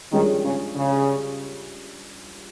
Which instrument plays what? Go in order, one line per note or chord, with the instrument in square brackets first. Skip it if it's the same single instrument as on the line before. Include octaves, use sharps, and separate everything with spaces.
[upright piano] G2 F3 G#3 C#4 G#4 [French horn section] D#3
[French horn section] C#3
C#3